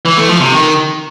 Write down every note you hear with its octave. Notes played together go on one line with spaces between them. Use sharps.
E3
A3
F3
C3
D#3